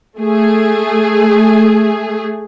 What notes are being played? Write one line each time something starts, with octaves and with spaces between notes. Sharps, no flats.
A3 G#4